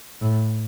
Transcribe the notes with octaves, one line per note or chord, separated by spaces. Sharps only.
A2